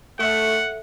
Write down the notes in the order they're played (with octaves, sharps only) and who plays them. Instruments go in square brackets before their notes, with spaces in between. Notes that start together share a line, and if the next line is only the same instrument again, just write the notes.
[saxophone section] A3 [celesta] A4 E5 [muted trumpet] F#5